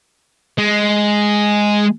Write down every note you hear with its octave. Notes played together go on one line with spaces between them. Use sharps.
G#3